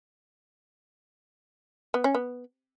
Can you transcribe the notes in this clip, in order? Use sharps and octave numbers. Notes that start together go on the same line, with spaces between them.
B3
C#4
B3